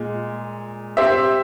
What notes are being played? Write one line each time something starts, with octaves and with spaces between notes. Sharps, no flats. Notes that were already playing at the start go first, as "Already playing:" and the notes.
Already playing: A#2 G#3
C4 G4 C5 E5